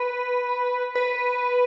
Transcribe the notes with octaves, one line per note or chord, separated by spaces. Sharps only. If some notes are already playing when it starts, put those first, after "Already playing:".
Already playing: B4
B4